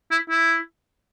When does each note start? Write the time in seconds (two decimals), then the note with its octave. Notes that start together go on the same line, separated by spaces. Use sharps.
0.11 E4
0.30 E4